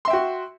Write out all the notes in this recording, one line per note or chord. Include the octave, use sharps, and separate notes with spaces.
F#4 E5 G5 C6